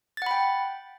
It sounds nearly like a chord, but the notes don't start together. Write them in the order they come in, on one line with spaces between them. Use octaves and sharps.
A6 F#5 B5 G5